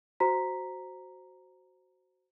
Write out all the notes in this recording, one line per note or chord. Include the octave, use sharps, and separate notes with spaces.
F#4 C5 A#5 B6